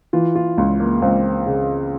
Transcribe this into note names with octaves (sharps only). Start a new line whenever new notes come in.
E3 F4
F4
C#2
A#3
C#2 C4
C#3